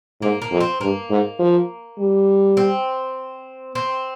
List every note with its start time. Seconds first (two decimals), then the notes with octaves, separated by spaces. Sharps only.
0.22 G#2 A#3
0.42 A#3
0.51 F2
0.61 C4
0.81 G2 A#3
1.10 G#2
1.39 F3
1.99 G3
2.57 C4
3.75 C4